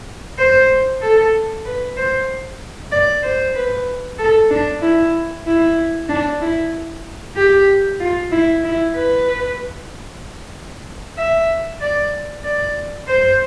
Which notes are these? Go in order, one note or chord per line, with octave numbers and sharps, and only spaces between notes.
C5
A4
B4
C5
D5
C5
B4
A4
D4
E4
E4
D4
E4
G4
F4
E4
E4
B4
E5
D5
D5
C5